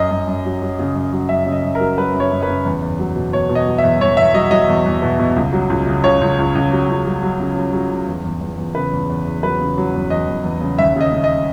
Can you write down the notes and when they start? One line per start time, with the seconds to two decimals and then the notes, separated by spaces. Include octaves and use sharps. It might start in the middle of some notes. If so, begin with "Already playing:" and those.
Already playing: F#2 D#5
0.11 F#2
0.27 F#2
0.45 F#3
0.62 F#3
0.79 C#3
0.95 F#2
1.13 F#3
1.29 F#2 E5
1.46 C#3
1.52 D#5
1.63 F#2
1.75 A#4
1.80 F#3
1.98 F#3 B4
2.14 F#2
2.20 C#5
2.31 F#2
2.43 B4
2.48 C#3
2.65 E2
2.82 E2
2.99 F#3
3.16 B2
3.32 B2 C#5
3.49 B2
3.55 D#5
3.67 F#3
3.78 E5
3.83 E2
4.01 E2 C#5
4.17 E2 E5
4.34 F#3 D#5
4.51 F#3 D#5
4.68 E2
4.86 E2
5.02 B2
5.19 B2
5.36 C#2
5.53 F#3
5.70 C#2
5.87 C#3
6.04 C#2 C#5
6.21 C#2
6.39 C#2
6.55 C#2
6.72 F#3
6.89 C#2
7.06 F#3
7.23 F#3
7.40 C#3
7.56 F#3
7.73 F#3
7.91 C#3
8.07 E2
8.24 E2
8.41 E2
8.58 E2
8.75 C#3 B4
8.93 E2
9.10 E2
9.25 E2
9.43 F#3 B4
9.61 C#3
9.77 F#3
9.94 E2
10.10 E2 D#5
10.28 E2
10.44 E2
10.61 C#3
10.78 D#2 E5
10.96 C#3 D#5
11.12 C#3
11.24 D#5